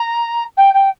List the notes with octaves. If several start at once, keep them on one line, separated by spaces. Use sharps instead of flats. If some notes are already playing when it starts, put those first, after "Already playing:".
Already playing: A#5
G5
G5